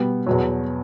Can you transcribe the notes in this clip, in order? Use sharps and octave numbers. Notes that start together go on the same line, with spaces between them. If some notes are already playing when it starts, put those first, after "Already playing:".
Already playing: B2 G3 B3
E2 B2 F#3